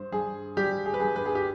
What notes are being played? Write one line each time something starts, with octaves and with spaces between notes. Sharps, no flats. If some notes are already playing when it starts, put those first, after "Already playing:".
Already playing: G2 C5
G2 G#4
G3 G4
G#4
B4
G2 G#4
B4
G#4
G4